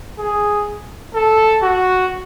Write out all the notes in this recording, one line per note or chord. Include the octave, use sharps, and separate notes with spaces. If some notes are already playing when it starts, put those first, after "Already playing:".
G#4
A4
F#4